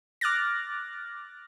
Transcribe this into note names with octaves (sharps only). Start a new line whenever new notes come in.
D6 F6 F#6 A6 A#6